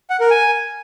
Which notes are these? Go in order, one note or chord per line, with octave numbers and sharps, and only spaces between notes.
F#5
A#4
G#5